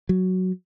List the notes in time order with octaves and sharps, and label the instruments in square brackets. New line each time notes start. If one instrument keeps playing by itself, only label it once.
[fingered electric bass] F#3